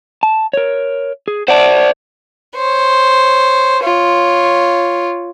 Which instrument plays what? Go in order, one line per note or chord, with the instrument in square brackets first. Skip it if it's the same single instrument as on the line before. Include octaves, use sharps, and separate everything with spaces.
[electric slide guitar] A5
A#4 C#5
G#4
[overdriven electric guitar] C5 D5 [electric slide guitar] F#5 A5
[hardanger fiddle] C5 C#5
F4 C#5